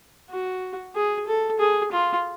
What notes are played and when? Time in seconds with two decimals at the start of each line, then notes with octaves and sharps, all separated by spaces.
0.30 F#4
0.95 G#4
1.27 A4
1.60 G#4
1.92 F4